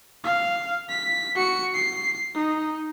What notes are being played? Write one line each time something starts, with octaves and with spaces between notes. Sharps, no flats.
F5
B6
F#4 C#7
C7
D#4